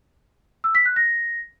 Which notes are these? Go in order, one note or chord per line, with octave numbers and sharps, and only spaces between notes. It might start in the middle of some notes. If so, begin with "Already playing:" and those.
E6
B6
F#6
A#6